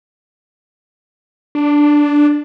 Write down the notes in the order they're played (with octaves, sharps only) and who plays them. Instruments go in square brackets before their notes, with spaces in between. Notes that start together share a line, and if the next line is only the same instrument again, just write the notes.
[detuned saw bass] D4